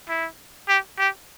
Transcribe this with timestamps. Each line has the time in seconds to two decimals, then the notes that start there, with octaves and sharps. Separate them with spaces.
0.09 E4
0.68 G4
0.99 G4